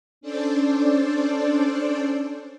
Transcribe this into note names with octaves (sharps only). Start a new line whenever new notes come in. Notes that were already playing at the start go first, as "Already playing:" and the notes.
C#4 D4 A4 C5 D5